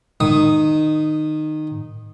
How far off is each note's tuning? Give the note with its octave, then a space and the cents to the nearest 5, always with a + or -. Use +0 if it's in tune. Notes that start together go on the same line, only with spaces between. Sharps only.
D#3 -15 D#6 +0